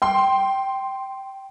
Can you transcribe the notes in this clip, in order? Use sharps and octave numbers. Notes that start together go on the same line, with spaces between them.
G5 C6